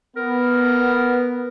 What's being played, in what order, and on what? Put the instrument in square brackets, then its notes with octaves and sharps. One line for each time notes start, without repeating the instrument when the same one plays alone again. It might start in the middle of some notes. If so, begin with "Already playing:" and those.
[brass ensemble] B3 [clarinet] A#4